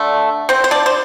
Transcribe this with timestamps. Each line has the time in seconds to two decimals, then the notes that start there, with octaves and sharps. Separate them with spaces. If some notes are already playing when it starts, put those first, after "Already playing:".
Already playing: D3 A3 D4 D5
0.49 C4 C5
0.64 C5
0.71 D4 D5
0.86 C5